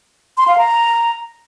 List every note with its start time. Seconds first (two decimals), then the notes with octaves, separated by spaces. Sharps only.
0.38 C6
0.48 F5
0.58 A#5